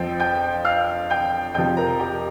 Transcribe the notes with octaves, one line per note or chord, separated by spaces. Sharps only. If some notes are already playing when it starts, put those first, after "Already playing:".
Already playing: F2 F3 C4 G5
G5 G6
F5 F6
G5 G6
F2 C3 F3 G5 G6
A#4 A#5
G4 G5